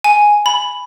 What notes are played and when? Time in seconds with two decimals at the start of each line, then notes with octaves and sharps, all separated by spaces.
0.04 G#5
0.46 B5